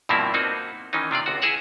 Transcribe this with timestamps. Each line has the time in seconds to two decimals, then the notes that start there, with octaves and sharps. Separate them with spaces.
0.09 G2 B2 F3 A#3 C4 E4
0.34 A#3 C4 D#4 F#4
0.93 D#3 E3 C#4 D#4
1.11 C3 D4 F4 D5
1.26 C#2 F#4
1.42 E4 G#4 E5 F#5 A#5